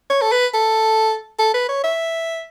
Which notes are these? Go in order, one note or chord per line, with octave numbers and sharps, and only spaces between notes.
C#5
A4
B4
A4
A4
B4
C#5
E5